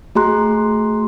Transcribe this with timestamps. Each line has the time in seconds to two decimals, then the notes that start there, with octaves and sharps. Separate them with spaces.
0.15 A3 F#4 G#4 A#5 C6 F#6